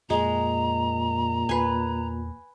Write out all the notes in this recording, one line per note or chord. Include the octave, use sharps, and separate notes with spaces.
F2 A#2 G#3 A#5
E2 B4 G#5